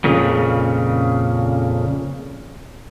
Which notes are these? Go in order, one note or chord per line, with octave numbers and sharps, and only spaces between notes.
F2 A#2 C#3